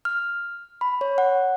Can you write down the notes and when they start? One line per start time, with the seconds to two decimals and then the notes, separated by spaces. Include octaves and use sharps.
0.05 F6
0.81 B5
1.01 C#5
1.18 F#5